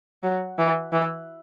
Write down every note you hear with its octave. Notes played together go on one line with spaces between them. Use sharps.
F#3
E3
E3